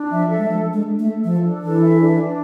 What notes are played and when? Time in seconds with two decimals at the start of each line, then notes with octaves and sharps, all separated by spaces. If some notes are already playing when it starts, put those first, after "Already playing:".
Already playing: D4
0.10 F3 E5
0.30 A4
0.38 G#3
0.48 F3 D4
0.68 D4
0.73 G#3
0.86 E5
0.99 A3
1.05 A4
1.24 F3 A4
1.44 D4
1.62 E3 A4
1.81 E5
2.00 D4
2.19 D4